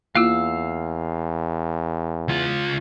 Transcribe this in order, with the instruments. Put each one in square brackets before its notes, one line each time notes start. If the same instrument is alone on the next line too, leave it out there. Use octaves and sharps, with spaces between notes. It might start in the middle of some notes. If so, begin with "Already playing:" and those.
[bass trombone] E2 [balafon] A#3 E4 F4 [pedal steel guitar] F5 E6
[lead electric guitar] C#2 F4